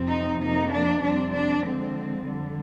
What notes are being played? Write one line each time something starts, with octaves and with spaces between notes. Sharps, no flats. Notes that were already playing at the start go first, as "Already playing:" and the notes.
Already playing: F2 C3 F3 C4
D#4
F2 C3 F3 A#3 D#4
D4
F2 C3 G3 C4 D4
D4
D3 F3 G#3 C4
F2 D3 G3